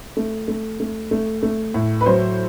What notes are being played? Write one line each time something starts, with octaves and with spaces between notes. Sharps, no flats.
A3
A3
A3
A3
A3
A2
B4
F#3 C5